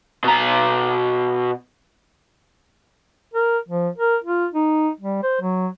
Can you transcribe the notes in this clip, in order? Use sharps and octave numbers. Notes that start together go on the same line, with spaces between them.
B2 A#5
A#4
F3
A#4
F4
D#4
G3
C5
F#3